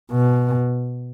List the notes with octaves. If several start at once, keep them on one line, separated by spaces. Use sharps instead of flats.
B2